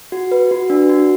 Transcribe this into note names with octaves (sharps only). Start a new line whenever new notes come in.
F#4
B4
F#4
D4
F#4